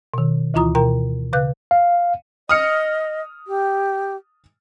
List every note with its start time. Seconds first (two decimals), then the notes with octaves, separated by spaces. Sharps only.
0.14 B2 D#3
0.54 D2 E3 E4 F4 A#5 D#6
0.75 B2 A#4 G5 A#5
1.33 C#3 B4 F5 F#6 G6
1.71 F5
2.49 D#5 D#6 F6 C#7
3.47 G4